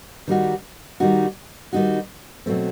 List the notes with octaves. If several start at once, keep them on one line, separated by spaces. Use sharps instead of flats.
D#3 G3 D#4 F#4
D#3 G3 D#4 F#4
D#3 G3 D#4 F#4
B2 F#3 A3 C4